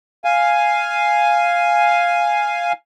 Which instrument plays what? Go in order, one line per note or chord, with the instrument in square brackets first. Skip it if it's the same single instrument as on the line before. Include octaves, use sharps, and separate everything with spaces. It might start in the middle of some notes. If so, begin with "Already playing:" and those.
[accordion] F5 G#5